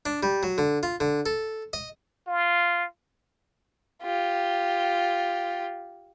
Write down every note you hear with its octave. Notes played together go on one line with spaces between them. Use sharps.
D4
G3
F#3
D3
F4
D3
A4
D#5
F4
F4 G4